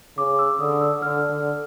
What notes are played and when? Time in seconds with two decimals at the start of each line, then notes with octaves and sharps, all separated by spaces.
0.17 C#3 D6
0.39 E6
0.60 D3 D#6
0.81 E6
1.02 D3 F6
1.30 D3